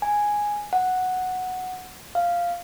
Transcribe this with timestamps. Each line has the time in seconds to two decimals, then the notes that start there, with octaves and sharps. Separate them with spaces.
0.02 G#5
0.73 F#5
2.15 F5